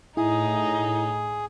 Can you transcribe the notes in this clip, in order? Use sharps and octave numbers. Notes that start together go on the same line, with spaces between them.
A2 D#4 E4 G#4